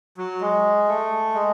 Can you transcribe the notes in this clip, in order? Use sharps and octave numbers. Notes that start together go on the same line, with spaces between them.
F#3
G#3
A3
G#3